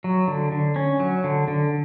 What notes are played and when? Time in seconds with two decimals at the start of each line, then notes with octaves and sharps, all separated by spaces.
0.04 F#3
0.28 D3
0.52 D3
0.76 C#4
1.00 F#3
1.24 D3
1.48 D3